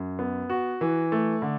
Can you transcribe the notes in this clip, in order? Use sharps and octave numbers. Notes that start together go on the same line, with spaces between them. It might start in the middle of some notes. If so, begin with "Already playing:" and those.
Already playing: F#2
B3
F#4
E3
A3
D3